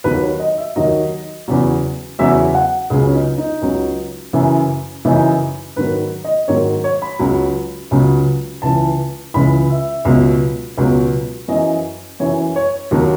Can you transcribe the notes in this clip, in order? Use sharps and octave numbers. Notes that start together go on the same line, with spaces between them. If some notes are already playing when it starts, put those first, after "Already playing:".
D#2 D#3 F#3 B4
C#5
D#5
E5
D#2 D#3 F#3 D#5
E2 C#3 F#3
E2 C#3 F#3 E5
F#5
C#2 C#3 F#3 G#4
C#4
D#4
D#4
C#2 C#3 F#3
F#2 C#3 E3
F#2 C#3 E3 D#4
G#2 D#3 F#3 B4
D#5
G#2 D#3 F#3 C#5
C#5
B5
C#2 C#3 F#3
C#2 C#3 F#3
C#2 C#3 E3 A5
C#2 C#3 E3 B5
E5
C#2 B2 F#3
C#2 B2 F#3
F#2 E3 D#5
F#2 E3 C#5
C#5
D#2 D#3 F#3